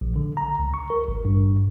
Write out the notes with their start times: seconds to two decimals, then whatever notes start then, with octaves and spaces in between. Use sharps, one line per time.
0.01 A#1
0.16 D3
0.37 A#5
0.59 C#2
0.74 C#6
0.90 A#4
1.08 G#1
1.25 G2